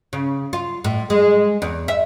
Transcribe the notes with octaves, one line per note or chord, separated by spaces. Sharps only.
C#3
F4
A2
G#3
E2
E5